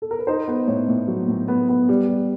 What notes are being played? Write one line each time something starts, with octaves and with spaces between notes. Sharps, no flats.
A4
A#4
B4
D#4 C5
B3
A2 C#5
A2
F#3
A2
B3
B3
G3
G3